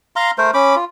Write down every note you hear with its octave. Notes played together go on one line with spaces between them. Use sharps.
F5 A#5 C6
A3 A#4 C5
C#4 B5 D6
F4